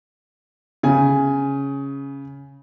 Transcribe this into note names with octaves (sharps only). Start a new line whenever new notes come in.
C#3 G#5